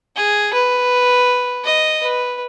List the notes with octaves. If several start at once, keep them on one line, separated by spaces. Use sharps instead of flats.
G#4
B4
D#5
B4